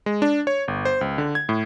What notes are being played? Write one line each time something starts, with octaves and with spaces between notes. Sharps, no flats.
G#3
D4
C#5
G1
C5
C#2
D3
G#6
A2